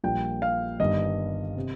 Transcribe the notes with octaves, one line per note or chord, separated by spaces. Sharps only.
A#1 A#2 G3 G5
F5
G1 G2 D#3 G3 D#5
C3